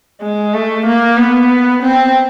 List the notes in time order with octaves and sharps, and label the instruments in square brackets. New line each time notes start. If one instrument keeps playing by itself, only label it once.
[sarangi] G#3
A3
A#3
B3
C4